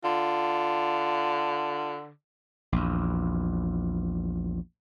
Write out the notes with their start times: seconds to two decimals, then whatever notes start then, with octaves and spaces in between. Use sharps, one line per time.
0.04 D3 F4
2.72 A#1 E2